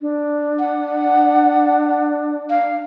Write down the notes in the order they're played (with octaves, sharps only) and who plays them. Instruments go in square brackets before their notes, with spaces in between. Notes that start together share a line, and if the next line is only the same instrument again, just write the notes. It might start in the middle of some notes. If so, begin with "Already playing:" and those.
[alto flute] D4
[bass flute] F#5
F5